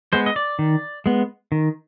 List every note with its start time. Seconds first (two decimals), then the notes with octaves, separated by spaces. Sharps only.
0.13 G#3 B3 C5
0.26 D#5
0.36 D5
0.59 D#3
1.06 G#3 B3
1.52 D#3